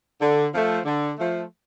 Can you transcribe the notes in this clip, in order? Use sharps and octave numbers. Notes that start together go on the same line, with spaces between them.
D3
F3 A3
D3
F3 A3